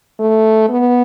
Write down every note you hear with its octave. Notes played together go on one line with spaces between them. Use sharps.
A3
B3